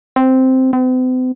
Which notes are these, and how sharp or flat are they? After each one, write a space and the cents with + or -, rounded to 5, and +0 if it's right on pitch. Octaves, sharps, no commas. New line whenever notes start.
C4 -5
C4 -45